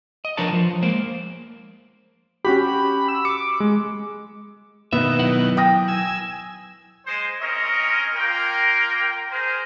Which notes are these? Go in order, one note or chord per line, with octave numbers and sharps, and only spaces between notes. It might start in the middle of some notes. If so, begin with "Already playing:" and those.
D#5
F3 D4 A#4 B4 C#5 A5
F3 C5
G#3 A#3 C5
C#4 F#4 G4 B5
E6
D6 C#7
G#3
B2 D#3 B3 E5
F#3 E4 F#5
G5 D#6 A#6
G#5 E6
G#3 C5
C4 C#4 A#4 C#5 D#5
A#3 F4 A#4 G5
G#4 A#4 C5